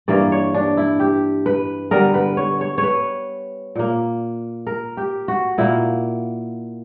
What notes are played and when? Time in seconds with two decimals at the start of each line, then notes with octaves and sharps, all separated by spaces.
0.08 G2 E3 A#3 D5
0.32 C#5
0.54 D4
0.77 E4
1.00 G4
1.46 B4
1.91 D3 G3 B3 A#4
2.14 B4
2.37 C#5
2.61 C#5
2.78 C#5
2.83 B4
3.75 A#2 A#3
4.67 A#4
4.97 G4
5.28 F#4
5.58 A#2 A#3 E4